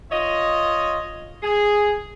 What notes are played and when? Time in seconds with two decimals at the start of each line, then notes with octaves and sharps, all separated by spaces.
0.11 F4 C#5 D#5
1.42 G#4